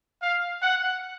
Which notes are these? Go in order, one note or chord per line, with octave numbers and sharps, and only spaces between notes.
F5
F#5